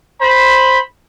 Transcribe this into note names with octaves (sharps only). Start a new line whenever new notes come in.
C5 B5